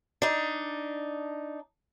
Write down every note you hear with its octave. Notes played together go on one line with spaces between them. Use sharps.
D4 D#4